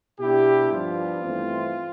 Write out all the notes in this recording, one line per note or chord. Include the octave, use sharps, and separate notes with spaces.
B2 B3 D4 E4 G4
G2 F3 B3 D4 F4
G2 E3 A3 C4